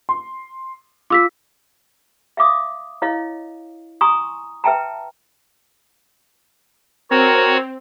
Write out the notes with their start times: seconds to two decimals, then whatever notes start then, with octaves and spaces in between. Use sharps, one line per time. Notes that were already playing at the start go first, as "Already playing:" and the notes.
0.09 C6
1.10 F4 D6 E6 B6
2.37 E5 F5 D6 D#6
3.02 E4 C#5 D#5 F5
4.01 G#5 A#5 C6 C#6 D#6
4.64 B4 E5 G5 A5 A#5
7.11 C4 F#4 A#4 C#5